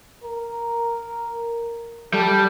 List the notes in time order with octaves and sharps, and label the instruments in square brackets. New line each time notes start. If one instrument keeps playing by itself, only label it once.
[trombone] A#4
[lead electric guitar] G3 [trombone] A4